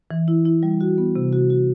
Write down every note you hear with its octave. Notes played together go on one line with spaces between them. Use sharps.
E3
E4
E4
G3
F#4
B3
C3
F#4
F#4